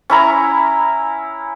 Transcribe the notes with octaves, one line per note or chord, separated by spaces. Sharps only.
C#4 E4 A#5